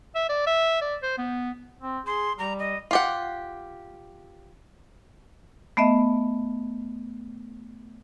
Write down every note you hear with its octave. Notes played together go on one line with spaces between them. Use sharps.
E5
D5
E5
D5
C5
B3
C4
G#4 C6
G3 A#5
D#5
F4 G4 F#5
A3 B3 D#5 E5